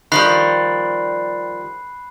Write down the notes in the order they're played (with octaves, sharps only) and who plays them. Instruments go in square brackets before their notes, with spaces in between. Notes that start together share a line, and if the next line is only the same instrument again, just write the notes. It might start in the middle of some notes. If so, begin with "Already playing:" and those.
[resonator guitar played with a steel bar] D#3 F3 G3 [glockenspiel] B5 F#6 C7